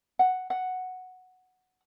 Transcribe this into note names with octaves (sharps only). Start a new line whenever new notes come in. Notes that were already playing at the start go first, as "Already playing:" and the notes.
F#5
F#5